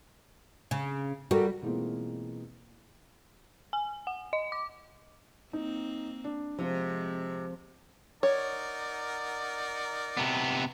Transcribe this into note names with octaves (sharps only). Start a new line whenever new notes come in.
C#3
G3 F#4 A4 A#4
B2 E3 G#3 A#3 C4 F4
G#5
F#5
D#5
D6
A#3 C4 D#4
D4
C3 F3 G#3 C4
D#4 A#4 C#5 D5 F#5
C3 B3